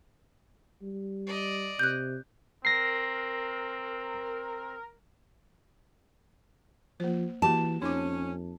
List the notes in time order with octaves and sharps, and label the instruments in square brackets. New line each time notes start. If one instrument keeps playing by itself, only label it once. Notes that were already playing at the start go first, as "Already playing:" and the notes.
[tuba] G3
[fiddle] D5 D#5
[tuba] C3 [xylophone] F#6 G6
[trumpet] C4 [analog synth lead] A#4 [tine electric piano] A#6 C7
[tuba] F3 [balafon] A#3 C5
[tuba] E3 [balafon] A#3 F#4 G4 [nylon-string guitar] A5
[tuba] F2 [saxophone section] C#4 [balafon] D#4 D6